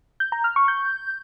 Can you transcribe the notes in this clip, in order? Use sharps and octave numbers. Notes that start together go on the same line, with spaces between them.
G6
A#5
F6
C#6
G6